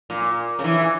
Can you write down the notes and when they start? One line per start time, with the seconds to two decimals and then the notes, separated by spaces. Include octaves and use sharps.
0.10 A#2
0.59 C#3
0.64 E3